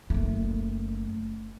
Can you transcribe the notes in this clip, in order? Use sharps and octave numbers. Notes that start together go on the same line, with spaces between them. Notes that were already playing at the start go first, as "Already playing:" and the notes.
F#1 A3